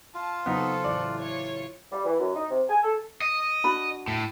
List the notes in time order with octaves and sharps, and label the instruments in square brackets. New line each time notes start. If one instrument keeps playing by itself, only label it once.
[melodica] F4 [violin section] A5
[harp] C#3 F#3 [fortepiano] B3 D#4 [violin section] C4 A4
[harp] A1 E3 F#6 [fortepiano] D5
[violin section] F4 C#5 C#7
[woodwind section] G3
E3
F#2
D#4
C3
G#5
A4
[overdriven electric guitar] D#5
[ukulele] D4 F#4 B5
[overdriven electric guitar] A2